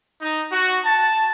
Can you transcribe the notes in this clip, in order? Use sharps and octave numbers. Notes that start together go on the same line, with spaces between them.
D#4
F#4
A5